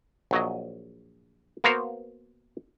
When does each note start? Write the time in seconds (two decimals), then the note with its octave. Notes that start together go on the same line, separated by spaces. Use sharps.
0.31 A#1 F#3 D#5
1.64 A#3 B3 F#4 A#4 C5 F5